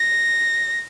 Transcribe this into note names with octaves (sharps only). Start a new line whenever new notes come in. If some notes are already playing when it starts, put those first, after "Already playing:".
Already playing: A#6